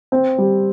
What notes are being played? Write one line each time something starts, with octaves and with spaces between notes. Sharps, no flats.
C4
G3